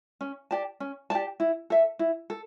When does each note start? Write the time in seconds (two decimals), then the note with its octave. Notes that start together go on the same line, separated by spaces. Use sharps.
0.21 C#4
0.51 G4 D5 A5
0.80 C#4
1.10 G4 D5 A5
1.40 E4
1.70 A4 E5
1.99 E4
2.30 A4